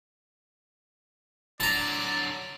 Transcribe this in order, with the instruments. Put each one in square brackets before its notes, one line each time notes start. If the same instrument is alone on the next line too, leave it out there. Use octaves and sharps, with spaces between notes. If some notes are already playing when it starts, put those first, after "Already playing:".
[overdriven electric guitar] D3 F#3 [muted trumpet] D5 [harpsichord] A5 A#5